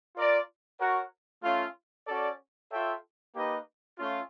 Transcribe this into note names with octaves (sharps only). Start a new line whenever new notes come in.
F4 A#4 D5
F#4 A#4 C#5 F#5
A3 C#4 F4
C#4 F#4 A4 D5
F4 A4 C#5 E5 G5
A#3 D#4 G4 B4 D#5
A3 C#4 F4